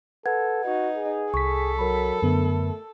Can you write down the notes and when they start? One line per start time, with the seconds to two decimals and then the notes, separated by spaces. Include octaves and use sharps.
0.26 A4 B4 F#5 G#6
0.65 D#4 F#4
0.96 G#4
1.34 C2 A4 C#6 B6
1.79 F#3 A#4 B5
2.22 F#2 D3 A3 B3